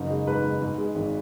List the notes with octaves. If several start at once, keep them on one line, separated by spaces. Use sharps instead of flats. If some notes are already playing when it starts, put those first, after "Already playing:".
Already playing: F#1 D#4
G#3
G#2 B4
G#2
G#2
G#3
G#1